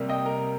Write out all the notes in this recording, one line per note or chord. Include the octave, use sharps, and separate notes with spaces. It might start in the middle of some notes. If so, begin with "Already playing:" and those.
Already playing: C3 G3 A#3
D#5 G5
A#4